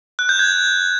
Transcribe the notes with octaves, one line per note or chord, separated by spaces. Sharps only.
F#6
G6
G#6